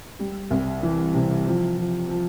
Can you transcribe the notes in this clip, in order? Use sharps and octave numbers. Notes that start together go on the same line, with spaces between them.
G3
C2
E3
C3
F3
F3
F3